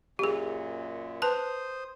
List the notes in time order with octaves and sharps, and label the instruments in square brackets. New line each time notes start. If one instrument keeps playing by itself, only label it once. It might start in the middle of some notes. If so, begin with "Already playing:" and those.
[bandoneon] F#2 A#2 [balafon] G4 G#4
[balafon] B4 A5 [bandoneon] C5 D#6